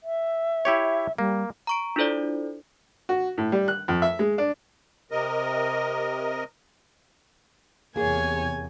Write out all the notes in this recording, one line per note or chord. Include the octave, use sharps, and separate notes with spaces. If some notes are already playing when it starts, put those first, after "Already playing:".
E5
E4 G4 C#5
G3 A#3
A#5 C#6 D7
D4 E4 F4 A4 C5 D5
F#4
A2
G3
F#6
F2
E5
G#3
D4
C3 A#4 D#5
E2 C3 A#3 G#4 C#5 G#5